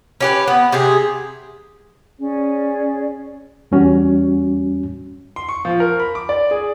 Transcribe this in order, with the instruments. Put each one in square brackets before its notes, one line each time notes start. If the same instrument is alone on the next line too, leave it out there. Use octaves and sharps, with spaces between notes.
[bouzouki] C#4 G4 B4
B3
C3 G4 G#4
[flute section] C#4 G#4 C#5 D5
[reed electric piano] E2 G3 C#4 F#4
[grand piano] C6
C#6
F3
A#4
B5
D6
D5
G#4